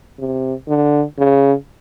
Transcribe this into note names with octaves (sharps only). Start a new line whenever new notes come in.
C3
D3
C#3